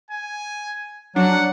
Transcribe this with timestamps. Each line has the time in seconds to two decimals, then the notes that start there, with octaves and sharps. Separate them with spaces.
0.11 G#5
1.16 F#3 D4 F#5